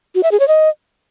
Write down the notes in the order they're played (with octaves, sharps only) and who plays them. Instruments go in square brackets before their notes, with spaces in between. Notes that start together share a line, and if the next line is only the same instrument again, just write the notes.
[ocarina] F#4
E5
G#4
C#5
D#5